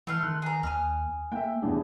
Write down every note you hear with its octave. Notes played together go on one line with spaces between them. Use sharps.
E3 A3 C6 F6
D#3 F#6
G#4 A#5
D#2 G#5 D#6 F6
A#3 E5 G5
D#1 E2 D4 G#4